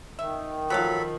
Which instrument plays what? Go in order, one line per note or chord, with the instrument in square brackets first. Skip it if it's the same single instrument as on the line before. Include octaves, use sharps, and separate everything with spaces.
[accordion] D#3 [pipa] E5
[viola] F3 [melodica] F#3 A4 B5 [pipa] F#4 C#5 F5